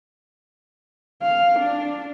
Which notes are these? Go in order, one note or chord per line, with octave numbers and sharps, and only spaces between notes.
F5
D4